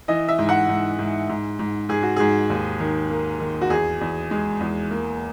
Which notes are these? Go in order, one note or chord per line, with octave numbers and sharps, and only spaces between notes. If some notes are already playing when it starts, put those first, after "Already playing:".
E3 D#5
E5
G#2
F#5
G#2
G#2
G#2
G#2
G#2 G#4
F#4
G#2 G#4
D#2
D#3
A#3
D#3
F#4
E2 G#4
E2
G#3
E2
A#3